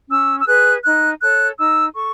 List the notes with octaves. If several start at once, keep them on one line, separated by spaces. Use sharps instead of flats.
C#4 E6
E6
G#4 B4 F#6
D#4 F#6
A4 C#5 F#6
D#4 E6
A4 C#6